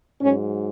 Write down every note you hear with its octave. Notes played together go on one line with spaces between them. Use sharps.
G#2 F#3 C#4